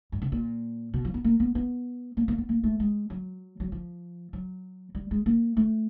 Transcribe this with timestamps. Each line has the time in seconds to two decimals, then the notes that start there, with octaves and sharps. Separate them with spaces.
0.12 G2
0.22 C3
0.32 A#2
0.94 B2
1.05 F3
1.14 B3
1.24 A#3
1.40 B3
1.55 B3
2.17 A#3
2.28 A#3
2.38 B3
2.49 A#3
2.64 A3
2.80 G#3
3.10 F#3
3.60 F#3
3.72 F3
4.33 F#3
4.95 G3
5.11 G#3
5.26 A#3
5.57 A3